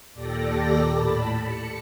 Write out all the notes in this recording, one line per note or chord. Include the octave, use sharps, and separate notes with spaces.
D#2 A#2 G4 A4 D5 A#6
A2 A5 B5
C#7